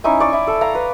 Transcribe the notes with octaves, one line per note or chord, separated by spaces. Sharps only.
C#4 D#4 E4 G#5
D5 C#6
E4
A4
F5 A#5
B4